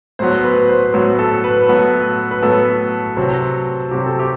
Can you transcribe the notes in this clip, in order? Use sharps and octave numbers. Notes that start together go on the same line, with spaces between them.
A2 F#3 B3 C5
B4
C5
A2 F#3 B3
A4
B4
A2 F#3 B3
B4
A2 F#3 B3 A4
C3 F#3 C4
C3 F#3 C4 G4
A4
G4